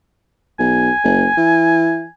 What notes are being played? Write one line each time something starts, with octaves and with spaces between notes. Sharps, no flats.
B1 G#5
F#1
E3